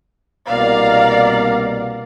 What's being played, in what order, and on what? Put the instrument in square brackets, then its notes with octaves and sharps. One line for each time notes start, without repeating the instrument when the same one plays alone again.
[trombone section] C2 B2 A#3 [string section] D5 F5 A#5